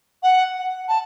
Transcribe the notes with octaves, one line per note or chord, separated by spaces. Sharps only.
F#5
A5